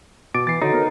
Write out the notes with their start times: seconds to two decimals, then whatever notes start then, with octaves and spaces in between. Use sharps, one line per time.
0.34 B2 D6 A6 D7
0.47 E3 A6 C7
0.62 D3 D#4 F#4 A4 C#5
0.73 B3 A#4